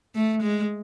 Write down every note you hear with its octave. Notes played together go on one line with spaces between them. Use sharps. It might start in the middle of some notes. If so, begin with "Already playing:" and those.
A3
G#3